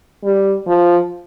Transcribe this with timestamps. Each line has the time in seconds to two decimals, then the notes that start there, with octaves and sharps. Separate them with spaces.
0.24 G3
0.67 F3